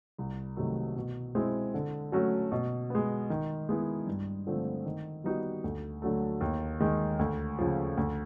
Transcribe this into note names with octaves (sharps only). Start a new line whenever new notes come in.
C2
C3 D#3 F#3 A3
B2
G#3 C4 E4
D3
F#3 A3 C#4 F#4
B2
G#3 B3
D#3
G#3 B3 E4
G2
D3 F3 A3 C4
D#3
G3 B3 D#4 F#4
D2
D3 F#3 A3
D#2
D#3 G#3
D2
C#3 F3
D2